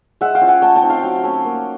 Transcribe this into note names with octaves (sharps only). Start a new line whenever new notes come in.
G#3 E5 F#5
F5 G5
C#4 F4
F#5 G#5
A3 G5 A5
G5 A5
C4 D#4
F5 G5
F#3
A3 C#4
A#3